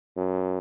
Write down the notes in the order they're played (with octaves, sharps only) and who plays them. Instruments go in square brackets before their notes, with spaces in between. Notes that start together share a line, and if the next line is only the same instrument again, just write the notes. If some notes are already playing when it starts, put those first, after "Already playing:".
[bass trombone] F#2